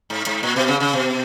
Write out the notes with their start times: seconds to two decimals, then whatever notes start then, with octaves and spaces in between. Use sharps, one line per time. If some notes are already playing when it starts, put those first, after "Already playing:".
0.10 G#2
0.26 G#2
0.43 A#2
0.56 B2
0.68 C#3
0.80 C#3
0.93 B2